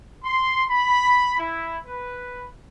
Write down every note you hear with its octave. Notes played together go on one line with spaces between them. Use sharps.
C6
B5
E4
B4